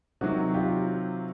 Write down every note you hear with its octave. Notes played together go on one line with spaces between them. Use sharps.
C3 D#3 F#3 F#4
F4 G4